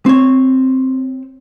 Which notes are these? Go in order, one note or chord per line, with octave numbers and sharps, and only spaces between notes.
C4 C#5